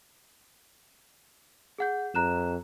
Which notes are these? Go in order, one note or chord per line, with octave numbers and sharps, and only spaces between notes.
G#4 F#5 G6
F2 A#5 F#6 E7